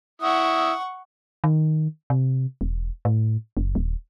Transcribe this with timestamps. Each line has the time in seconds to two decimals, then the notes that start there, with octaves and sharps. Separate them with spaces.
0.22 E4 F#5 C#6 D#6
1.44 D#3
2.10 C3
2.61 E1
3.05 A2
3.57 F#1
3.75 D#1